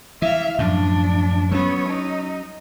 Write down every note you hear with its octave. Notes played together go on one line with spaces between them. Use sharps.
E3 E5 F5
F#2 A2 F3 D4
F#3 B3 C#4 C#5
D#4